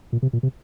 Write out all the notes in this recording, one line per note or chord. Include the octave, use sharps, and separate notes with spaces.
A#2
C3
A#2
C3